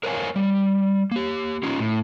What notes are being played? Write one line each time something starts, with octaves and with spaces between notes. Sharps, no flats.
A#4 C5 C#5 F5 G#5
G3
A#3 G4
C#4 D#4 F4
A2